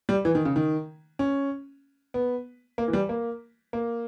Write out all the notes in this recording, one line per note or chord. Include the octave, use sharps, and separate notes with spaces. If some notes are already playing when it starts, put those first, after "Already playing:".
G3
E3
D#3
C#3
D#3
C#4
B3
A#3
E3
G3
A#3
A#3